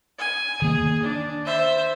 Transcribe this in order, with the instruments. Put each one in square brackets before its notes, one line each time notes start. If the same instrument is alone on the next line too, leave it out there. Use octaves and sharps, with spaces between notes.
[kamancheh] G#5
[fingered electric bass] D#3 A#3 [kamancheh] G#4
[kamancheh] D4
C5 E5